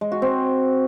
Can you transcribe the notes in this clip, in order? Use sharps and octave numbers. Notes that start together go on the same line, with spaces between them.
G#3
F#4
C4